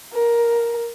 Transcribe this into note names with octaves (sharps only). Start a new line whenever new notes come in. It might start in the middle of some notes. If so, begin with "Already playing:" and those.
A#4